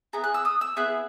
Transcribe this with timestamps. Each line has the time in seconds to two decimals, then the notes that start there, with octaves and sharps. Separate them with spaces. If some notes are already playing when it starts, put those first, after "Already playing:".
0.13 B3 E4 G#4 A#5
0.24 F#6
0.34 E6
0.45 D#6
0.61 E6
0.77 B3 E4 G#4 F#6